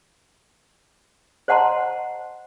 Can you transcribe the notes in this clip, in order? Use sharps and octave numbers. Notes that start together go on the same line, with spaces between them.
C5 D#5 F#5 A5 A#5 C6